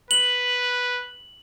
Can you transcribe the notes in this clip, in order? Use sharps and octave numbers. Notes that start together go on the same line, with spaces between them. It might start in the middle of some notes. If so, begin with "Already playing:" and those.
B4 F#7